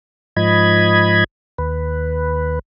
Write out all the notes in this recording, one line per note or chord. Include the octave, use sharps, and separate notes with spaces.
G#2 F3 D#5 B5 G#6
D#2 B4